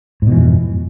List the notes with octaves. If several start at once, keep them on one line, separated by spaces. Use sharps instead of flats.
F2 G#2 B2 E3